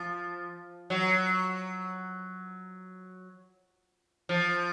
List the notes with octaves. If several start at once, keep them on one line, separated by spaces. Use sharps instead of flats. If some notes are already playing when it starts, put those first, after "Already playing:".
Already playing: F3
F#3
F3